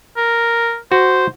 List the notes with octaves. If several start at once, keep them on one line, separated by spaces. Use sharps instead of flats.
A#4
F#4 C5